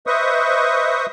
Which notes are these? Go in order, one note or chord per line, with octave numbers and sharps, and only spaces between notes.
B4 C5 D#5 E5 C#6 D#6